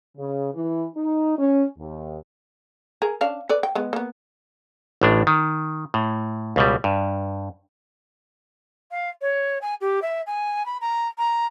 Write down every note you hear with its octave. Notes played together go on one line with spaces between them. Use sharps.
C#3
E3
D#4
C#4
D#2
G#4 A#4
C#4 D4 F5
A4 B4 D5
G5
G#3 B3
A#3 B3
A1 A2 D4
D#3
A2
C#2 B2 G3
G2
F5
C#5
G#5
G4
E5
G#5
B5
A#5
A#5